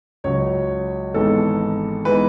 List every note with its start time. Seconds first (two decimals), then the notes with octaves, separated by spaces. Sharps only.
0.24 C#2 C#3 F#3 C#5
1.14 G#1 G#2 E3 G#3 B3 A4
2.05 E3 G#3 B3 D#4 B4